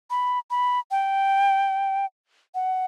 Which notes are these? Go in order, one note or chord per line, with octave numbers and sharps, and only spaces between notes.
B5
B5
G5
F#5